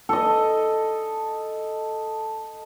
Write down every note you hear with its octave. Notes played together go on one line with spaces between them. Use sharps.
A4 D#5